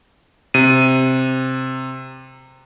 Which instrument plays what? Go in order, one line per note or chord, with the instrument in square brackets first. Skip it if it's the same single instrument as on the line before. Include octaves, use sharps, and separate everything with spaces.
[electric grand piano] C3 D#7